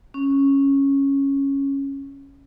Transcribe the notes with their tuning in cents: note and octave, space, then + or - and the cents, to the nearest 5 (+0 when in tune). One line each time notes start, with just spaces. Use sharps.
C#4 -5